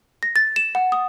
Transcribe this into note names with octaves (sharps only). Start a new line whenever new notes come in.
A#6
A6
E7
F#5
D#6